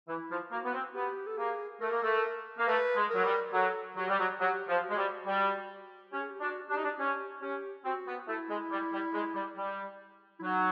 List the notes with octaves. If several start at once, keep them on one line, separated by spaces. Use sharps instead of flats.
E3 E4
F3
A#3 F#4
B3
C4
B3 G4
A4
A#3 G#4
A3 A#4
A#3
A3
A#3
A3 B4
G#3
F#3 A#4
G3
F#3 A4
F#3 G4
G3
F#3
F#3 G4
F3
F#4
G#3
G3
G3
C#4 G4
G#4
G4
D4 F#4
D4 G4
D#4
D4
C#4 G4
C#4 G4
C4 F#4
B3
A3 E4
G#3
G3
G3
G#3
G3
G3
E4
F#3 D#4